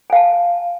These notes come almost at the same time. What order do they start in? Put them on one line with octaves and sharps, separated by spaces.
G#5 F5 A5